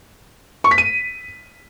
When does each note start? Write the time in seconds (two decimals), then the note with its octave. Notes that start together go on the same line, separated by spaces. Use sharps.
0.64 C#6
0.71 B6
0.78 D#7